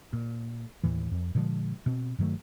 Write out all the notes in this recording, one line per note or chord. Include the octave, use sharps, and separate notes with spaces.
A#2
D#2 A2 E3
F2
A#2 D3 F3 G#3
B2 C4
G2 D#3 F#3 A3